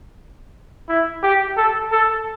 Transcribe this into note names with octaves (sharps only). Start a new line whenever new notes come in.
E4
G4
A4
A4